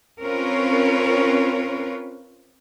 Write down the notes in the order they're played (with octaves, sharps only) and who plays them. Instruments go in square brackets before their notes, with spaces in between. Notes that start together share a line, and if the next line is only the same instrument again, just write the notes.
[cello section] C4 C#4 F4 A#4 B4 C#5